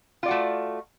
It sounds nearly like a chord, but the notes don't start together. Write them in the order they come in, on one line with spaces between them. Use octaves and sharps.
F4 D5 F#4 A3